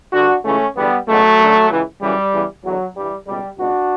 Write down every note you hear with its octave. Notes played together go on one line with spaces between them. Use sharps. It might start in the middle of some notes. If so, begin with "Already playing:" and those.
G2 D3 D4 F#4
C#2 C#3 E3 A3 C#4
E2 D3 G3 B3
C#2 B2 F#3 A3
F#2 D3
C#2 C#3 E3
F#2 C#3 E3 G3
E2 C#3 E3
E2 D3 F#3
G2 E3 G3
C#2 B2 G3
C#2 B2 D4 F#4